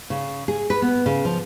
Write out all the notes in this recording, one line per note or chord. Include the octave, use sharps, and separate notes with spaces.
C#3
G#4
B4
B3
C#3
F3